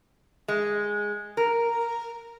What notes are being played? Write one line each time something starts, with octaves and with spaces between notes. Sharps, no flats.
G#3
A#4